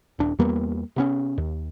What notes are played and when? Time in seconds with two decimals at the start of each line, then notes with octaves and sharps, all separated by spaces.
0.19 D#1 D4
0.39 E2 G3 A#3 B3
0.96 C3 B3 C#4
1.38 D#2